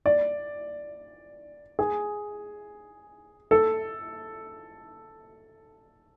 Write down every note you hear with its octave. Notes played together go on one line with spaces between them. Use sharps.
D5
G#4
A4